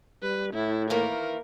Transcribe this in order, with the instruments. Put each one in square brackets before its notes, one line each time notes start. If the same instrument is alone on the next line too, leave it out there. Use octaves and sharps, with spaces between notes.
[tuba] G3 [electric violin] B4
[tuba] A2 [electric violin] E4
[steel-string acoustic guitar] D#3 E3 A#3 [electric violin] A#4